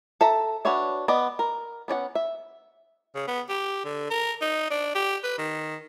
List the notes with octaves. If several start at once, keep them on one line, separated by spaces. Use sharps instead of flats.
A4 E5 A5 A#5
D4 F#4 B4 C#5 E5
B3 D5 D#5
A#4
B3 C#4 D5 F#5
E5
C#3
B3
G4
D3
A#4
D#4
D4
G4
B4
D#3